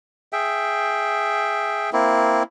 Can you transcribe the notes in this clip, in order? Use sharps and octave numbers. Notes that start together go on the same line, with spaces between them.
G#4 E5 G5
A#3 C4 E4